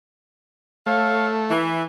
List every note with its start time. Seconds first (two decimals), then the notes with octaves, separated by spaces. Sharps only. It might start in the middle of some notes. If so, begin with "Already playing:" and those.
0.86 A3 A4 C#5 F5
1.50 E3